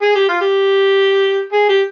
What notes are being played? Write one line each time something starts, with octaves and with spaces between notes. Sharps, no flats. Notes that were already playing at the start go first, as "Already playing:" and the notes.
G#4
G4
F4
G4
G#4
G4